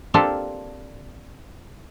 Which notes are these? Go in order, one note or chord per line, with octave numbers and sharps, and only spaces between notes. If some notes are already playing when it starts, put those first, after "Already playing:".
A#3 C4 D4 F4 G4 A4